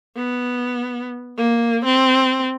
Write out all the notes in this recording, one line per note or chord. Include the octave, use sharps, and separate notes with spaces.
B3
A#3
C4